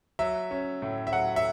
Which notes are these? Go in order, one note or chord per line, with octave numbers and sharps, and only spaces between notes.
F#3 E5
C#4
A2
E5
F#3 F#5
E5